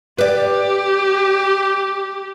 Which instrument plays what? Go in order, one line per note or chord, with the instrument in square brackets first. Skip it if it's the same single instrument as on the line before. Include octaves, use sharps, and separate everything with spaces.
[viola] G4 [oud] B4 D5